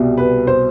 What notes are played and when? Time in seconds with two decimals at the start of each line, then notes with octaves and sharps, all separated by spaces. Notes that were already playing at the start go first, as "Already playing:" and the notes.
Already playing: C2 B2 G3
0.17 B4
0.47 C5